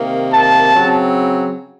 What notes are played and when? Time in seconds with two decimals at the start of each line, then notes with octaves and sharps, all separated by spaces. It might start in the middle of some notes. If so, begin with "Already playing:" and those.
Already playing: C3 D#3 A#3
0.32 A5
0.74 C#3 F#3 C4